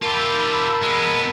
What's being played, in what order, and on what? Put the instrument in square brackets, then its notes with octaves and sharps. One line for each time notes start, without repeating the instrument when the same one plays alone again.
[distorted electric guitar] F4 G4 [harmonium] A#4 A5 [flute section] B5 E6
[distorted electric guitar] G#3 B3